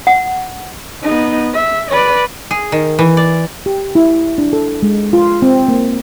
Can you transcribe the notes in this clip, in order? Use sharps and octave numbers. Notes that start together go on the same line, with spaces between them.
F#5
B3 D#4
E5
B4 D5
G#4
D#3
E3
D5
G4
E4
D4
A4
G#3
F4
C4
A#3